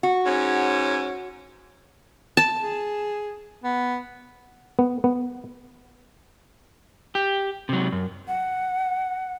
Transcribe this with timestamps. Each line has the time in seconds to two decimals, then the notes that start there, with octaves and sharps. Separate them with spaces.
0.03 F#4
0.25 G#2 C#4
2.37 A5
2.60 G#4
3.64 B3
4.79 B3
5.04 B3
7.15 G4
7.69 C3 F#3
7.92 F#2
8.28 F#5